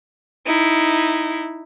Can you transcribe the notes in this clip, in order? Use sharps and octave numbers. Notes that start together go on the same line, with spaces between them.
D#4 E4